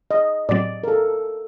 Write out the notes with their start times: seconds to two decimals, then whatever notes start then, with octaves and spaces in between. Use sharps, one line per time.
0.11 D#5
0.49 A2 F#3 C4 D5
0.84 A#4
0.88 A4